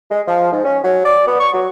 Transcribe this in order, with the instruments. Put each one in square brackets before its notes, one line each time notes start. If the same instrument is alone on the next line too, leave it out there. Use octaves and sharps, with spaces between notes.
[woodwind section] G#3
F3
G#2
C#4
F#3
D5
B3
C#6
F#3